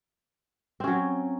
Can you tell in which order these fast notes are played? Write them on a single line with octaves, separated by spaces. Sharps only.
C4 C#4 F#3